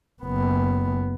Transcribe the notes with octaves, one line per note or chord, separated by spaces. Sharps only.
F#1 B3